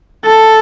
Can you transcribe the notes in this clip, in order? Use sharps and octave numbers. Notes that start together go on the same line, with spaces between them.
A4